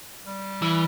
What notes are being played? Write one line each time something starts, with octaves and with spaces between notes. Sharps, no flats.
G3
E3